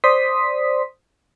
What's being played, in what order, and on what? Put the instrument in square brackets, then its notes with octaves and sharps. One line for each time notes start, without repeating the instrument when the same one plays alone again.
[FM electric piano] C5 D5 C6 D#6 B6